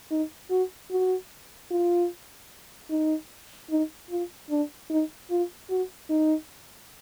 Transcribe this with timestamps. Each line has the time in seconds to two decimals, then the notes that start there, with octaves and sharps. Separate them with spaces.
0.11 D#4
0.50 F#4
0.91 F#4
1.71 F4
2.90 D#4
3.70 D#4
4.10 F4
4.50 D4
4.90 D#4
5.30 F4
5.70 F#4
6.10 D#4